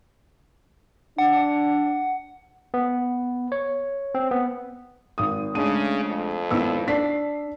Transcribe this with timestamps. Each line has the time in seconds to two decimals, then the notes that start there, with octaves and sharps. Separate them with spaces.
1.18 D4 F#5
2.74 B3
3.52 C#5
4.15 C4
4.31 B3
5.18 G#1 D#6
5.55 C#3 G#3 A3 D4 D#7
6.05 F2
6.51 G#1 B3 E4 E6
6.88 D4 B6 C7